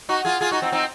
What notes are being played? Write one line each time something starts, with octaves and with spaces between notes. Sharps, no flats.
D#4 F#4
F4 G#4
F4 G#4
D#4 F#4
C4 D#4
C4 D#4